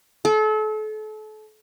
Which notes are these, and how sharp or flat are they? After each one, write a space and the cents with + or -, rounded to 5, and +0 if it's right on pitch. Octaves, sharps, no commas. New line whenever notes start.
A4 -35